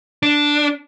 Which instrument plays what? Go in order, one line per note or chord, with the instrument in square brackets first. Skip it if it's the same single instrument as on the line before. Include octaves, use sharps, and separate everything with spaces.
[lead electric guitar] D4